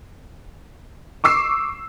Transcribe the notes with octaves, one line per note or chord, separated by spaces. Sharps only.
C#6 D6 E6 C7